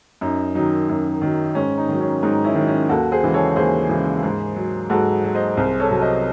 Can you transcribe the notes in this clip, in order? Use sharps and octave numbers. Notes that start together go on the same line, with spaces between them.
F#2 D#4
D#3 F#3 D#4
F#2
D#3 F#3
G#2 C#4
D#4
D#3 F#3
C#4
G#2 D#4
C#4 E4
D#3 F#3
C#4
D#2 F#4 A4
G#4 C5
C#3 E3 G#3
A4 C#5
D#2 G#4 C5
C#3 E3 G#3
G#2
F#3
G#2 F#4 A4
F#3
C5 D#5
C2 G#4 C5
A4 C#5
C3 F#3
C5 D#5